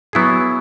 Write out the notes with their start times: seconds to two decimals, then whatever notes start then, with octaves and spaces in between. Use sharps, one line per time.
0.13 F#3 B3 E4 G#4